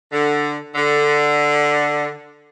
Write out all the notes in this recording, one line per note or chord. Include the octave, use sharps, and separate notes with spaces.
D3
D3